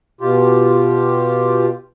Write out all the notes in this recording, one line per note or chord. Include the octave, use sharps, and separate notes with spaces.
B2 F4 G4